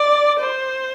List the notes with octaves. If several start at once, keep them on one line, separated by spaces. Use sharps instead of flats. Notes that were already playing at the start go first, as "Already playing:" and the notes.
Already playing: D5
C5